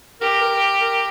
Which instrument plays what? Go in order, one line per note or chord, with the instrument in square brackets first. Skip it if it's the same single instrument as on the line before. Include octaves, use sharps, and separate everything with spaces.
[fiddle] G4 [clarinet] A#4
[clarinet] A#4
A#4